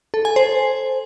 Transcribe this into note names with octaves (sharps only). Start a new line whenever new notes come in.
A4
G#5
C5